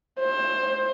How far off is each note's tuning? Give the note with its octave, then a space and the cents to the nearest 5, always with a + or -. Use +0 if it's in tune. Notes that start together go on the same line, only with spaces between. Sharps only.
C5 +20